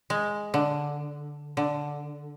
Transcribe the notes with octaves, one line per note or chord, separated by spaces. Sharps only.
G#3
D3
D3